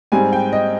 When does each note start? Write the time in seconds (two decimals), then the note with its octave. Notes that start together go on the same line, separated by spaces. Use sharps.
0.12 G#2 G3 C4 G#5
0.33 G5
0.53 D#5